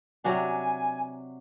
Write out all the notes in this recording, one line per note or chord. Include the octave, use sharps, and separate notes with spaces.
C3 F#3 D4 G#5